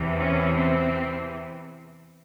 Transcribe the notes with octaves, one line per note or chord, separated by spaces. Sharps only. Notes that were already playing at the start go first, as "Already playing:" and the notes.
Already playing: E2 C3 E3
C#4
C4